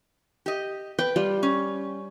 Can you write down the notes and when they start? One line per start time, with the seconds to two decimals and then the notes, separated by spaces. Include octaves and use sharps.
0.46 G4 D#5
0.99 B4 G5
1.16 G3 F4
1.43 C#4